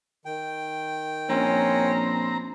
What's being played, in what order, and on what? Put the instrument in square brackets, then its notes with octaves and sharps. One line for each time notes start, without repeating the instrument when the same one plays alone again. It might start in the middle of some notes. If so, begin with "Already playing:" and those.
[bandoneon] D#3 G5
[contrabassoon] A#1 [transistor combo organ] C4 A#5 [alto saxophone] C#4